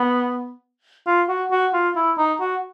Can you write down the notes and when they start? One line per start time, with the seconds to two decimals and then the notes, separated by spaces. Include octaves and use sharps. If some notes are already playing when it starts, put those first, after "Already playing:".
Already playing: B3
1.07 F4
1.29 F#4
1.51 F#4
1.74 F4
1.96 E4
2.18 D#4
2.40 F#4